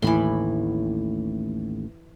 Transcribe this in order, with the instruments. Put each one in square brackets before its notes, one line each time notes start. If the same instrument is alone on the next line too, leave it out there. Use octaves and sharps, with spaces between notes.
[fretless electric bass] A1 D#2 A2 [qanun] E3 B5 C6